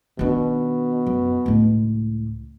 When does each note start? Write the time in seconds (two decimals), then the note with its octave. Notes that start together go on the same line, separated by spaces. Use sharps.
0.19 B2 D#3 D4
1.06 F#2
1.46 C#2 A2